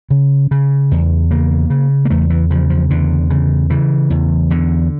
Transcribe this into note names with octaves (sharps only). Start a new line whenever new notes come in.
C#3
C#3
E2
C#3 A#3
C#3
A#3
E2 A3
E3
C#3 F3
F3
E2 D3
C#3
C#3 E3
E2
E2 D3